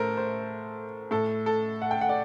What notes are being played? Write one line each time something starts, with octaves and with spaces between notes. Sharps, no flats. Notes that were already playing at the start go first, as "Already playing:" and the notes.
Already playing: A2 A4 A#4 C5
C5
A2 A4
A4
F#5
G5
F#5
D5